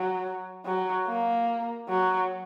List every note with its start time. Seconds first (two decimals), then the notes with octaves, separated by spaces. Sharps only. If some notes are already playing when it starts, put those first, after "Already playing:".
Already playing: F#3
0.65 F#3
1.07 A#3
1.89 F#3